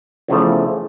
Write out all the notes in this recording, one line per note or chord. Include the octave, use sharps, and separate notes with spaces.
E2 C#3 F3 A3